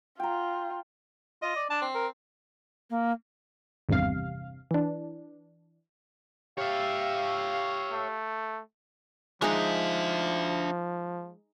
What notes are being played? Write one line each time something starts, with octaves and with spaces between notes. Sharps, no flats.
F4 G5 A#5
F4 D#5
D5
D4 A5
C4
A#4
A#3
G#1 E2 G2 C3 F5
E3 D4
G4 C#5 E5 F5
A3
F3 G#3 D4 D#4 E5